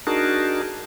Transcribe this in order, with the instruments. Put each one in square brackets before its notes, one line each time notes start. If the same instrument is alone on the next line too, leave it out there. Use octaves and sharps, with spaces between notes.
[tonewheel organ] D4 D#4 F#4 G#4 A#4 A5